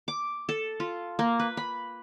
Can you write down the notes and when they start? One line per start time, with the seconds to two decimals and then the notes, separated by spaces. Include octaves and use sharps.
0.08 D6
0.49 A4
0.80 F4
1.19 A#3
1.40 B4
1.57 B5